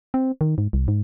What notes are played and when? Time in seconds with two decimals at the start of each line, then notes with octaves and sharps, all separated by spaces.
0.14 C4
0.41 D#3
0.58 G#2
0.73 C2
0.88 G#2